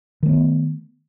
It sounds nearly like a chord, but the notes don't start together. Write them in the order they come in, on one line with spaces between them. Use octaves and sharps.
D#3 A3 B3